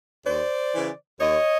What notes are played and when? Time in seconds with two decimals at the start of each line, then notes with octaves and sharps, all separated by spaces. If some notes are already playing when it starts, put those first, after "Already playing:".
0.26 D#2 C5 D5
0.74 C#3 E3
1.21 D#2 C#5 D#5